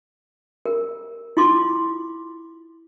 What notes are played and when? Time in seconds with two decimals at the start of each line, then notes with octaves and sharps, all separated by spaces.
0.66 A#4
1.37 E4 F4 C6 D6